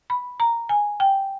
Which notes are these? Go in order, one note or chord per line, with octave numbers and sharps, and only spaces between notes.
B5
A#5
G#5
G5